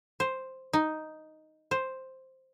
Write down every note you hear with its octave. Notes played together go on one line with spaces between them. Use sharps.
C5
D#4
C5